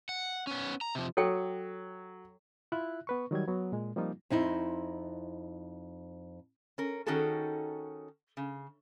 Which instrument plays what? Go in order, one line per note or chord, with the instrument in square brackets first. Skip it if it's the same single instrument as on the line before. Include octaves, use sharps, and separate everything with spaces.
[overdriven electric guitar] F#5
B3 C#4
A#5
C3 F3
[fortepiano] F#3 [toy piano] A4 C#5 G5
[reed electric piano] E4 F4 E5 F#6
B3 B4 C#6
D#3 F#3 G3 G#6
F#3 B3
A#2 G#3
F3 G3 A#3 C4 D#4 F4
[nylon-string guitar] F2 C4 D#4 E4
[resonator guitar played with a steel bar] C#4 A#4
D#3 C#4 D#4 F#4 G#4 A4
C#3